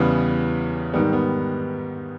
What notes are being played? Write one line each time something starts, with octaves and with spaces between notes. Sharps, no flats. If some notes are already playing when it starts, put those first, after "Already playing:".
Already playing: E2 C#3 E3 G3 B3
G#2 D#3 G3 B3
B3